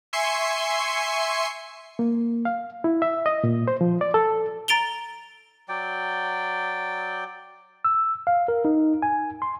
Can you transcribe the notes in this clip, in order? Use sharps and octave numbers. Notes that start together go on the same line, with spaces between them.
E5 G#5 C6 C#6 C7 C#7
A#3
F5
E4
E5
D#5
A#2
C5
F3
D5
A4
A#5 A6 D7 F7 G7
F#3 D5 G5
E6
F5
A#4
D#4
G#5
C6